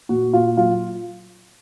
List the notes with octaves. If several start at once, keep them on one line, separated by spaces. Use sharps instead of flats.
A#2 F#4
A#2 F4
F#3 F4